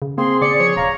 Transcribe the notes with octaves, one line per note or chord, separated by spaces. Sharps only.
C#3
A#3 C4 G#4 C6
C#3 D5 C#7
F3 C#5
D#1 F5 A#5